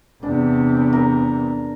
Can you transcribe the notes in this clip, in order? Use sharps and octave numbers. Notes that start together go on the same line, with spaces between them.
E2 C3 D4
A#4